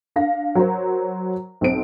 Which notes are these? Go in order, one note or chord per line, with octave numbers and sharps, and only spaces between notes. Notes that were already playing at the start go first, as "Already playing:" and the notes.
D4 F5 A#6
F#3 A#4 C5
B1 C4 D7